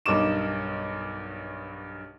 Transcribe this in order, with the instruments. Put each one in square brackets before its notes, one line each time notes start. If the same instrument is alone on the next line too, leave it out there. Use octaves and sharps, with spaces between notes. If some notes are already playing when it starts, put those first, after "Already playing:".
[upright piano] B1 G2 A#4 D#5 D6 E7